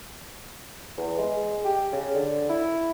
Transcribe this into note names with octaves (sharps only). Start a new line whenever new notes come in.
E2
G#3
G4
C#3
D3
E4